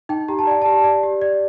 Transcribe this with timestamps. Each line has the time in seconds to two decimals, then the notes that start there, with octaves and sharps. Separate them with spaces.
0.09 D#4 G5
0.28 G4 A#5
0.39 A5
0.47 D5 G5
0.62 G4 A5
0.84 D5
1.03 G4
1.22 D5